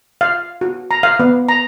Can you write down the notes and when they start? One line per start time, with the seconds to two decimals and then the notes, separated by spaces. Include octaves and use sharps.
0.21 F5
0.61 F#4
0.91 A#5
1.03 F5
1.20 B3
1.49 A#5